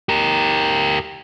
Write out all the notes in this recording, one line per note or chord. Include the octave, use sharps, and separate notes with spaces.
G4 A#4